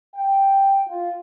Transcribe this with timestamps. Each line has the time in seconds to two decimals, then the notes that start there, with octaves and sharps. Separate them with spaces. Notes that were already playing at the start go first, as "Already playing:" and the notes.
0.15 G5
0.87 F4